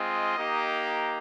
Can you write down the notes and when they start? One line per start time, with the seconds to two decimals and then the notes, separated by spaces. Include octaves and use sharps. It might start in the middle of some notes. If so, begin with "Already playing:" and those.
Already playing: G#3 C4 F4 D#5
0.36 A#3 D#4 G4